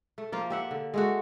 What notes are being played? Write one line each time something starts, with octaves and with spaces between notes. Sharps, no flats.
A3
F3 A#3 F4
G4 E5 F#5
D3
G#3 A3 F#4